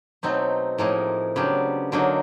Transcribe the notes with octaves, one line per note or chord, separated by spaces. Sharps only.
B2 F#3 A3 C4 D#4
A2 F3 A#3 D#4 G#4
C#3 F#3 B3 D4 G4
D3 F#3 A#3 D#4